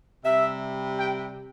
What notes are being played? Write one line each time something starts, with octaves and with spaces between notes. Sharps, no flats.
C3 G3 E5
G5